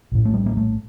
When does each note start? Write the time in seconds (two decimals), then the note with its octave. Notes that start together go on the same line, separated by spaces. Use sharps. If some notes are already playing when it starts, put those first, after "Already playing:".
0.12 A#1 A2
0.25 A3
0.34 G3
0.46 A#3
0.57 A3